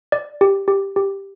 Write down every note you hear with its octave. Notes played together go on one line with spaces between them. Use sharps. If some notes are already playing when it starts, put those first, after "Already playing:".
D5
G4
G4
G4